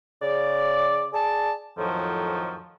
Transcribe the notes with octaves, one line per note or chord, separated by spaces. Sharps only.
C#3 D5
G#4 D5 A5
F2 A2 D#3 F3 F#3